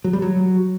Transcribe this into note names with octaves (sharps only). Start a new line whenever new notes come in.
F#3
G3
F#3